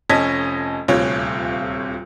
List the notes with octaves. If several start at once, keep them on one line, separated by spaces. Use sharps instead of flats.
F1 C#4 D#5 A5 G#6 B6
D#1 D2 C3 F4 C#5